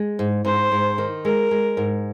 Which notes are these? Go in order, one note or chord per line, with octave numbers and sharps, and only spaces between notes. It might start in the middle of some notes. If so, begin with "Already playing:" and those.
Already playing: G#3
G#2
G#2 C5
G#2
D#3
G#3 A#4
G#3
G#2